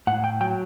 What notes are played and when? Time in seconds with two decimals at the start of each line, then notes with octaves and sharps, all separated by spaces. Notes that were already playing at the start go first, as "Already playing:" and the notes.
0.07 A2 F#5
0.24 G5
0.41 F#3 G5